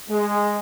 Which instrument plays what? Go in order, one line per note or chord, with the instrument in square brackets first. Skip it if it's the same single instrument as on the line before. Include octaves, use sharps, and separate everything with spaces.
[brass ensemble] G#3